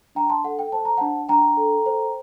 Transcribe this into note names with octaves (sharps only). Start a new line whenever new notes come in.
D4 G5 A#5
A5 C6
A4 F#5
G5
C5 A5
A#5
D4 F#5 A5
D4 G5 A#5
A4
C5